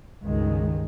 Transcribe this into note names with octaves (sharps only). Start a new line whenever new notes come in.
C#2 G2 D#3 G#3